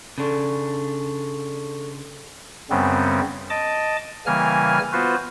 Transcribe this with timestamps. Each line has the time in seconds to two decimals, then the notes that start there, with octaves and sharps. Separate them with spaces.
0.18 C#3 D4 A4 C6 C#6
2.70 F#2 C#3 G3 B3 C4
3.50 D#5 A5 D6
4.26 C#3 E3 G3 A#3 G#5 F6
4.93 B3 F4 F#4 B4 C5